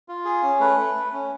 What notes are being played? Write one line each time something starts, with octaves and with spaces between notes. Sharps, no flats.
F4
G#4
C#4
A3 B4
A3
A3
C#4